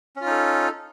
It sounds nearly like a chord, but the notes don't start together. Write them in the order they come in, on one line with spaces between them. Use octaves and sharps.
C#4 F4 D#4 A4